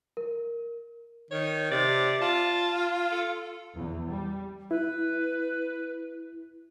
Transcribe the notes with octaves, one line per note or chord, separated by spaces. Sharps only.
A#4
D#3 C#5
C3 D5
F4 A5
A4
E2
G3
E4 B4